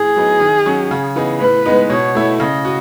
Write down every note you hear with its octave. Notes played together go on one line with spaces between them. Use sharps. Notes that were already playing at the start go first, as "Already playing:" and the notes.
Already playing: A2 G#4
F#3 B3 D#4
D#3
F#3 C#4
C#3
E3 B3 D#4 G#4
A2 B4
G#3 B3 D#4
B2 C#5
A3 E4
C#3 D#5
F#4